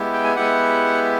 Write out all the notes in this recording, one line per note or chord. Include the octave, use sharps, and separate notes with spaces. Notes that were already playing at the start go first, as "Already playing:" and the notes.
Already playing: G#3 B3 E4 G4
G5
G#5
G#3 B3 E4 G4 F#5